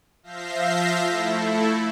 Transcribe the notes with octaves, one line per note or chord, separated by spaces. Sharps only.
F3 E5 F5 G6 A#6 C7
A3 E4 A4